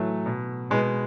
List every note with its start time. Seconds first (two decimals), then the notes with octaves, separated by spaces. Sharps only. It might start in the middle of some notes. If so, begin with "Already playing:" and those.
Already playing: A2 E3 F#3 A3
0.26 B2
0.71 B2 G#3 B3